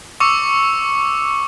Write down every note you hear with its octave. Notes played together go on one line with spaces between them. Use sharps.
C#6 D6 E6 C#7